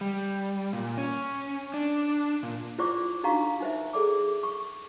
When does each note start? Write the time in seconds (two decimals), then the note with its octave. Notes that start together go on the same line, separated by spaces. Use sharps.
0.01 G3
0.73 A#2
0.98 C#4
1.74 D4
2.43 A#2
2.78 E4 F4 C5 D5 C#6 D6
3.24 D4 D#4 F#4 F5 A#5 C#6
3.60 D#4 C5 E5
3.93 G#4 A4 D5 D6
4.43 C#6